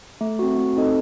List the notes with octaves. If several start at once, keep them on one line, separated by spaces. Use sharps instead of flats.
A3
C4 F#4
A3
C4 D#4 A4 D#5